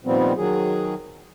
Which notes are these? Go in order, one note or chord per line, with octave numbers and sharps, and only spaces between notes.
A#2 D#3 F3 G3 B3 C4
D#3 F#3 G#4